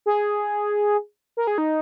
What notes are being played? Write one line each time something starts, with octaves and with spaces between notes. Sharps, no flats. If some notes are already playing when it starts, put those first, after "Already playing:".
G#4
A#4
G#4
D#4